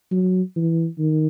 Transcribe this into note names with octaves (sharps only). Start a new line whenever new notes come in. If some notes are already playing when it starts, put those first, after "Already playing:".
F#3
E3
D#3